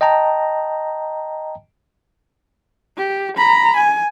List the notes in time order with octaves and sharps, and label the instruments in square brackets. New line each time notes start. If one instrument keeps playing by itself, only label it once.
[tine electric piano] D#5 G5 A5 A#5
[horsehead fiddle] G4
A#5 B5
G#5